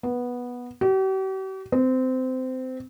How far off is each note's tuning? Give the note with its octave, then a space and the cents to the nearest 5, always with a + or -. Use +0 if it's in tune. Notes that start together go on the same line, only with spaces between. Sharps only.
B3 -10
G4 -45
C4 -20